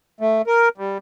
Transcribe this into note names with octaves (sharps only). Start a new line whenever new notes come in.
A3
A#4
G3